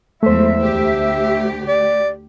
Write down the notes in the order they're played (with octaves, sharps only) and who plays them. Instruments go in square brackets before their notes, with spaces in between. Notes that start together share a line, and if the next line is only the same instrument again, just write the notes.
[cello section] E2 F3 G#3 [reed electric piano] A3 C5 [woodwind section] E5
[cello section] D2 G4
[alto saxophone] D5